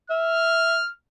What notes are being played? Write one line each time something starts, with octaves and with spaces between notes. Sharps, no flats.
E5 F6